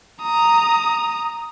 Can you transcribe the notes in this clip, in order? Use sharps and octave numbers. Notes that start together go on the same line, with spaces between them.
A#5 D#6